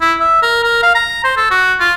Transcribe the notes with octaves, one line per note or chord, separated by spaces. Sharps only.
E4
E5
A#4
A#4
F5
A#5
C5
A4
F#4
F4